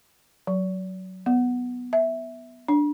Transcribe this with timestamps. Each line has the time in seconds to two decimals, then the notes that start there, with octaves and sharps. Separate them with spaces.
0.47 F#3
1.26 B3
1.93 E5
2.68 D4